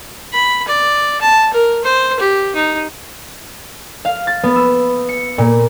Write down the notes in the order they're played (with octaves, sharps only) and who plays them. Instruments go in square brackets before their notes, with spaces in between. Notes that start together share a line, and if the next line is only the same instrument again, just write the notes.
[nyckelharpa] B5
D5
A5
A#4
C5
G4
D#4
[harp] F5
A6
B3
E6
C#7
A#2